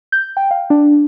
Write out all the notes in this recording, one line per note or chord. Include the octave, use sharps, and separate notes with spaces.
G6
G5
F5
D4